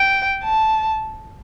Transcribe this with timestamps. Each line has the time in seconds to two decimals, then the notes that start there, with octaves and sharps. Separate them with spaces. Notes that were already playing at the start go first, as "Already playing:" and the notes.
Already playing: G5
0.44 A5